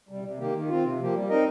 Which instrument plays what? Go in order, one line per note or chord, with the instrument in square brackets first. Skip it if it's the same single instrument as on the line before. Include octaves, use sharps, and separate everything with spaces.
[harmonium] C3 G3
C3
D#3 A#3 G4
D#3
C4 F4
C3
F3 A#3 G4
G3
C4 D#4 A#4 D#5